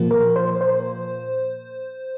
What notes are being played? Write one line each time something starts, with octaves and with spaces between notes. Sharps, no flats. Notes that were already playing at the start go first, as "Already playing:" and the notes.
Already playing: A#2 F3 A#3
A#4
C5
C5